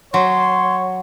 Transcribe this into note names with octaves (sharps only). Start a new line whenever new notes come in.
F#3 C#5 C6